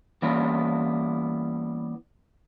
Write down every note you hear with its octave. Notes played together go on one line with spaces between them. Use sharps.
E3 G3 A#3 B3 C#4 E4